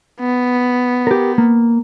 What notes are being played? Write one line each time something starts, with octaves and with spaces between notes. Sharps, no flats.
B3
G4 A#4
A#3